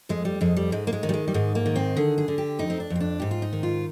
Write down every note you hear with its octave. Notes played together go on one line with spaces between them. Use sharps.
F2 G#3
G3
F2 G#3
G3
G#2 G#3
A#3
G#3
D#3
G3
G#3
G3
G#2 G#3
A#3
D#3
C4
D3 G#4
G#4
D3
G4
F2 D#4
C4
D4
F2
C4
D4
G#2 G4
F4
D#4
D#3
F4